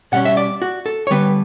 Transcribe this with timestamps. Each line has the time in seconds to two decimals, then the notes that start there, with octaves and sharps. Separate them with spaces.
0.12 B2 G3 C#4 F#5
0.25 E5
0.37 D5
0.62 F#4
0.86 A4
1.07 C#5
1.11 D3 G3 B3 B4